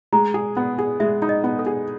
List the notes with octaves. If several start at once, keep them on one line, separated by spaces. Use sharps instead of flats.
G#3 A#5
G#4
B3
G#4
G#3 E5
D#4
D#5
B3
A4
G#4